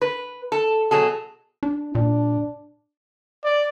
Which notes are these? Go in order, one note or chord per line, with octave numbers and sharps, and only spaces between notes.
B4
A4
B2 F#3 G#4 A4
D4
A#2 D4
D5